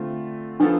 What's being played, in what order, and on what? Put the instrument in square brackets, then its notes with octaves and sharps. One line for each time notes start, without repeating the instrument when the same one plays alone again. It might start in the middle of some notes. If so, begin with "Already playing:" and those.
Already playing: [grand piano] D3 A3 C4 F4
[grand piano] F3 B3 F4 A4 [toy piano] D4